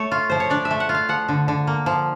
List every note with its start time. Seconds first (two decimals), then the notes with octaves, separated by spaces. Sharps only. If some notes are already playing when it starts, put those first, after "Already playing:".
Already playing: A3 C#5
0.11 F4
0.30 F3 C5
0.40 C#5
0.50 D4 D5
0.65 E5
0.71 A3
0.80 F#5
0.89 F4
0.94 F5
1.09 F3 F#5
1.29 D3
1.48 D3
1.67 A#3
1.86 F3